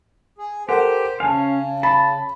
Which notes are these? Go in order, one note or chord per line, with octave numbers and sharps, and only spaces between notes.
G#4
G4 A4 A#4 C5 F#5
C#3 C#4 F5 G#5 A5
A5 B5